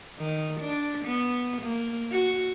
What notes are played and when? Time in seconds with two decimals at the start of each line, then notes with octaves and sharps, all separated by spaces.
0.18 D#3
0.60 D4
1.05 B3
1.61 A#3
2.12 F#4